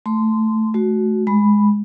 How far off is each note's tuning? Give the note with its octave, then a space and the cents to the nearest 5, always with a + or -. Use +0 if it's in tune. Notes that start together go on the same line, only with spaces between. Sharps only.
A3 +0 C6 -15
A3 -25 F#4 +0
G#3 +0 B5 +0